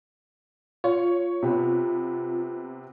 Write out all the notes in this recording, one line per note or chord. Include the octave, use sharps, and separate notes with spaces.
F4 C#5
C3 B3